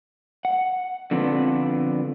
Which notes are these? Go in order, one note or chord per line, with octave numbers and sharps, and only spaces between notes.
F#5
D3 F3 B3 C4 D4